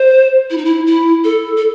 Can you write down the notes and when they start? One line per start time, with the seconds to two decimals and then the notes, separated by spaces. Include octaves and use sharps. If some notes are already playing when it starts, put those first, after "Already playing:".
Already playing: C5
0.50 E4
0.58 D#4
0.65 E4
0.87 E4
1.24 A4
1.57 A4